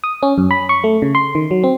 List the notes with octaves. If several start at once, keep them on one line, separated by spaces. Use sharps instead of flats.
D#6
C#4
F#2
B5
C#6
A3
C#3
C6
D#3
F#3
C4